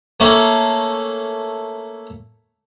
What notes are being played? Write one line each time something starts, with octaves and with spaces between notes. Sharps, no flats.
A3 A#3 C#4